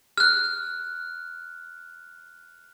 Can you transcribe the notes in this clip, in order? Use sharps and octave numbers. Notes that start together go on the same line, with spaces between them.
F6 F#6